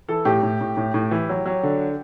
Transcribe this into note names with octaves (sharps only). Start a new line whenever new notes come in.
E3 A4
A2 G4
A2
A2
A2
A2
E3
F#3
F#3
D3